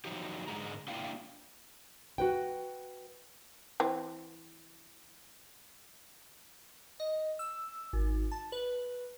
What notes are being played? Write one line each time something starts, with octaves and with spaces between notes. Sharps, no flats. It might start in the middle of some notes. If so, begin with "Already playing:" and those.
F3 F#3 D#4 F#4 G4
G#2 D3 G#3 A#5
A#3 D4 E4 F4 F5 G5
F#4 B4 G5
E3 C4
D#5
E6
G#1
A5
B4